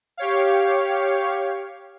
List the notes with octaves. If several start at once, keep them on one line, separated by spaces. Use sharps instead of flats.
G4 C#5 F5